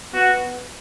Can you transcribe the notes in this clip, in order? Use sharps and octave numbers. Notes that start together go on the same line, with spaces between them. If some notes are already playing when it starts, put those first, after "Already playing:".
B3 F#4